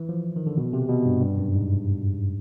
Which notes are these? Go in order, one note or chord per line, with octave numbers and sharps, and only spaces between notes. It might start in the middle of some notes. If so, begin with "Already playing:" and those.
Already playing: E3
F3
D#3
D3
B2
C3
B2
G2
G2
F#2
G#2